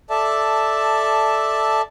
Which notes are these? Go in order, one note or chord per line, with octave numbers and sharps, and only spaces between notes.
A4 D5 E5 A5